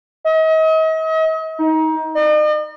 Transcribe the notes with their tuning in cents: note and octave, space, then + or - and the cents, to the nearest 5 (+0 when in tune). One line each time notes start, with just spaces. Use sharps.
D#5 +40
D#4 +25
D#5 -45